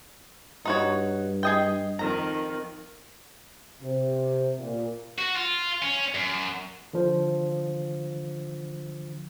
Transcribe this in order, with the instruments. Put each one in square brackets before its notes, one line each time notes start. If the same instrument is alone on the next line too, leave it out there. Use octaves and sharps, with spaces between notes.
[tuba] G2 [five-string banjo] D#4 F#4 C#5
[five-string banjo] G#4 D#5 G5
[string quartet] F2 D#3 [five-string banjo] A#5
[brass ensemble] C3
A#2
[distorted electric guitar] F#4
F4
C#4
F#2
[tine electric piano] D3 F3